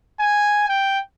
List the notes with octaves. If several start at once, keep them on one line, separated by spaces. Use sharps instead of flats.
G#5
G5